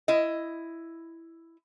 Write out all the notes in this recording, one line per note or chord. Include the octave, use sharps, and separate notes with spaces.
E4 D#5